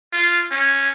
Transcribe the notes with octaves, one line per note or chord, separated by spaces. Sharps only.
F4
C#4